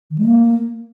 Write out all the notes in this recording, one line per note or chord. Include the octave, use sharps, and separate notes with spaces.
D#3
G#3
A#3